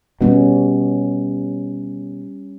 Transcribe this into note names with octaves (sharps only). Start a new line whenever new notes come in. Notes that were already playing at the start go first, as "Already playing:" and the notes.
B2 G3 C#4